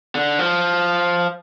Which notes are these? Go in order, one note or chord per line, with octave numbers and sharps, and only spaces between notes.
D3
F3